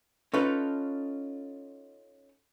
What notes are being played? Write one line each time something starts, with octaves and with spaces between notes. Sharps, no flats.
C#4 D#4 F4 A4 B4